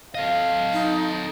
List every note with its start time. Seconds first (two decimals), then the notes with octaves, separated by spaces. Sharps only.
0.15 A4 D#5 F5
0.73 D#4